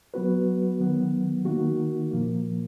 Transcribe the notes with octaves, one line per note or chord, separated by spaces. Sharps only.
F#3 B3 F#4 B4
D#3 F#3 B3
D#3 A#3 D#4 F#4
A#2 F3 A#3